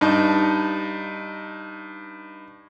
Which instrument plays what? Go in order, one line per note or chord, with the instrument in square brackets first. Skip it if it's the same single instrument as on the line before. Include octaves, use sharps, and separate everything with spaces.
[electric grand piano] G2 D#4 A5